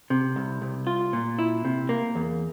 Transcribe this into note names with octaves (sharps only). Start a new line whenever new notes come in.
C3
C2
C2
F4
A#2
E4
C3
A#3
E2